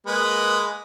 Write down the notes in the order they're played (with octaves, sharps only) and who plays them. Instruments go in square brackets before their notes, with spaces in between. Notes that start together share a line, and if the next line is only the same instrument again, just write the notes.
[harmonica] G#3 A#3 B4